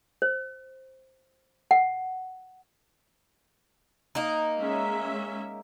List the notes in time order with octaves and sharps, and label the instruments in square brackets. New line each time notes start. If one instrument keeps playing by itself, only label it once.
[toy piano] C5
F#5
[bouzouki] A#3 D#4
[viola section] G#3 C#4 E5